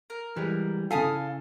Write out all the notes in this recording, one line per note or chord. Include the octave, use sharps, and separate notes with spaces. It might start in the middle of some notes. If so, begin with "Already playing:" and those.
A#4
E3 G3 G#3
C#3 E4 A4 F5 G#5 D#6